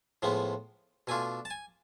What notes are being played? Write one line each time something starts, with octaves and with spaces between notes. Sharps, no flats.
A2 F3 G#3 B3
B2 A3 D4 F4 G#5
A5
G#5